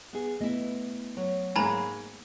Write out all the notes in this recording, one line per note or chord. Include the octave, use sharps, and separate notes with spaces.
B3 G#4
A3 B3 E4 D#5
F#3
G#2 G#3 A#3 G#5 A#5 B5